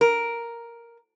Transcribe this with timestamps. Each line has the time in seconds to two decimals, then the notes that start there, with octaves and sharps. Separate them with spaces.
0.01 A#4